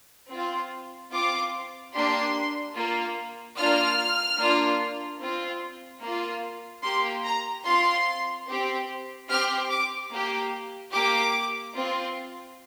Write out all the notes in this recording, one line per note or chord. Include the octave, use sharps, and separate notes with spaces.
C4 F4
C4 F4 D6
A#3 D4 G4 C6
A#3 F4
A#3 D4 F4 F6
A#3 D4 F4
C4 F4
A#3 F4
A#3 G4 C6
A#5
C4 F4 C6
C4 G4
C4 G4 F6
D6
A#3 G4
A#3 G4 D6
C4 F4